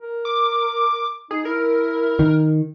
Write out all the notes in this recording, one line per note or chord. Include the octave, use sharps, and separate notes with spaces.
A#4
D6
D#4 G#4
E4 A#4
D#3